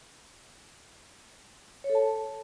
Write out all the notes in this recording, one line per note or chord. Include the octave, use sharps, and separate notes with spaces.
C#5
A4
A5